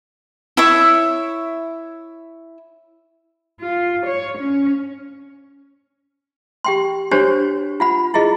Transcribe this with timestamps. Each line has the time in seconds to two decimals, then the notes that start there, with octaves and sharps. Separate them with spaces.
0.57 E4 C#5 E5
3.60 F4
4.06 C#5
4.39 C#4
6.64 G4 G5 C6
7.11 D4 F#4 G4 C5 C#5
7.80 F4 F#5 B5
8.14 E4 F4 G#4 D#5